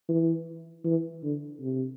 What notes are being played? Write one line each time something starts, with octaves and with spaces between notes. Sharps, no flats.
E3
E3
D3
C3